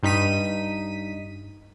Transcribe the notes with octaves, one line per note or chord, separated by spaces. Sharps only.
G2 D#4 B6 D#7